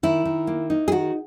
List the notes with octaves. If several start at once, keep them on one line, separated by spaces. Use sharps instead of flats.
D#3 E4
D#3
A#3
D#4
G#4
D#3 F#4